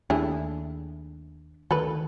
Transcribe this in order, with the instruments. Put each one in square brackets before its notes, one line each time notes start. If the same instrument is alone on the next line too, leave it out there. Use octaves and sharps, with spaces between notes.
[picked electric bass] D#2 A3 D4 [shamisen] E4 G4 G#4
[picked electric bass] D2 D#3 [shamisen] A4 B4